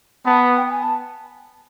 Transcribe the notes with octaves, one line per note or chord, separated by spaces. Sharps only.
B3 A5
G5
G5
G#5
A5